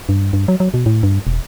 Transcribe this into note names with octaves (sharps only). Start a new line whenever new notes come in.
G2
G2
F#3
F#3
B2
A2
G2
E1